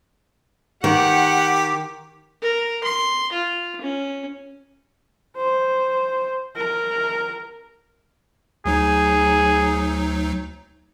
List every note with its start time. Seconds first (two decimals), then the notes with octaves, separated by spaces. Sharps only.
0.84 D#3 G4 F#5
2.42 A#4
2.84 C6
3.32 F4
3.81 C#4
5.37 C5
6.56 A#4
8.65 D2 F#3 D#4 G#4